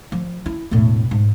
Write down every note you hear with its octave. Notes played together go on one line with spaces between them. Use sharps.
F3
E4
E1 A2
G#2